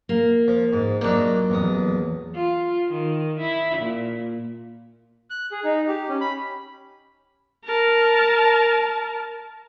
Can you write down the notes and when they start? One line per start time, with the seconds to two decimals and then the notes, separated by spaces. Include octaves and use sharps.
0.09 A#3
0.48 F3
0.73 G#2
1.01 A#2 F#3 A#3 D4 D#4
1.50 A1 E2 D#6
2.34 F4
2.92 D#3
3.41 E4
3.77 A#2
5.30 F#6
5.52 G#4
5.64 D#4
5.88 G4
6.09 C#4
6.21 B5
7.64 A#4 A5